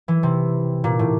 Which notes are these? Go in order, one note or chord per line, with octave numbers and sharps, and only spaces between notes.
E3
C3
A#2
A2